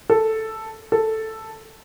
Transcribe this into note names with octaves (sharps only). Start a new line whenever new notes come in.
A4
A4